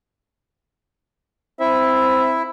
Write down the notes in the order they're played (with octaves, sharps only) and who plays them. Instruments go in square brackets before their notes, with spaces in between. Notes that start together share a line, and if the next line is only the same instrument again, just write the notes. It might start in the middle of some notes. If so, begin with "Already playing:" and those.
[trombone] C4 [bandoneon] E4 [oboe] E5